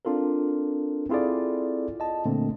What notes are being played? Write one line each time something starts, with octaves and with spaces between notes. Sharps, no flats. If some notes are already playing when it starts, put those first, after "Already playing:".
C4 D4 F4 A4 A#4
C4 E4 F4 G#4 A4 D5
D#5 A5
A#2 D3 A3 A#3 C4